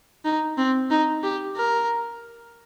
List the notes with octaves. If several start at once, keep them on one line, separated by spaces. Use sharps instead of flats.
D#4
C4
D#4
G4
A#4